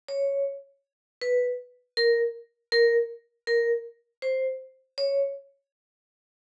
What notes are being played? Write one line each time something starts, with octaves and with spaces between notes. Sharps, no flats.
C#5
B4
A#4
A#4
A#4
C5
C#5